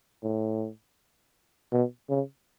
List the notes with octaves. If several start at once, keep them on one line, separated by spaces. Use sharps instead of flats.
A2
B2
C#3